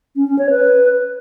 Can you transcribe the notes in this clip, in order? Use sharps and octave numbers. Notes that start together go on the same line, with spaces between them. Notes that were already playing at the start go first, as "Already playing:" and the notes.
C#4
C#4
C#5
B4